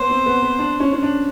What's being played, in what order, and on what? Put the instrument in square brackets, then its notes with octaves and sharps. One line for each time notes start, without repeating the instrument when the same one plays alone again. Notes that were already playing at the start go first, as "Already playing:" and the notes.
Already playing: [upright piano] B3 [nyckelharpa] C5
[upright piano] C4
B3
B3
D4
C#4
C#4
D4